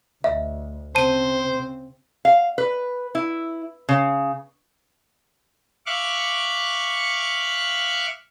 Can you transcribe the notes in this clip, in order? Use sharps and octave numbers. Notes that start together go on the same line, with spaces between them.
D2 D#5 E5
C#3 C4 C5 A5 D#7
F5
B4
E4
C#3
E5 F5 C#6 D6 F#6